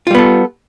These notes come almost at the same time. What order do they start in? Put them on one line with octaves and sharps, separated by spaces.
F4 G3 B3 A4